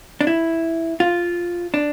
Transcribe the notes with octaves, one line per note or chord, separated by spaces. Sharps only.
D4
E4
F4
D4